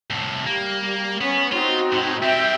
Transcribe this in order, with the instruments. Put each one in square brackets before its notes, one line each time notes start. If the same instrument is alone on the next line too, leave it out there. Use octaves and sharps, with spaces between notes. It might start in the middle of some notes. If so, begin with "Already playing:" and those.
[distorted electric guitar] C2 A2
[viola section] G3 [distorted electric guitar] A#3
[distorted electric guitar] B3 [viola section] C#4
[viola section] C4 D#4 F#4 [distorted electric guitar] F4
[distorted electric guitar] A2
[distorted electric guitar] G3 C4 [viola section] E5 G5